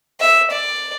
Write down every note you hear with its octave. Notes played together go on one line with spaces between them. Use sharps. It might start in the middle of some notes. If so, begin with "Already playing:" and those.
E5
D5